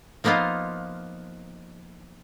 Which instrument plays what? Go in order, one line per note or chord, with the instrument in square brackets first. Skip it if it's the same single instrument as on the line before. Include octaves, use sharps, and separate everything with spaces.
[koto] F3 A#3 B3 D#4 F4